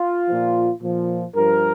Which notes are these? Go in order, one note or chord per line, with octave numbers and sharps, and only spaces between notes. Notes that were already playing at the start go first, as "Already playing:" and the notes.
Already playing: F4
A#2 F3
A#2 F3
G2 F3 A#4